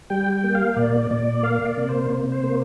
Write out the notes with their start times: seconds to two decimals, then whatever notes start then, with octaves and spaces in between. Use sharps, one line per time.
0.10 G3 G5
0.32 G5
0.44 A#3
0.55 F5
0.76 A#2 D5
1.11 A#2 D5
1.43 A#3 F5
1.65 D5
1.77 C3
1.89 C5
2.10 C3
2.32 C5
2.43 A#3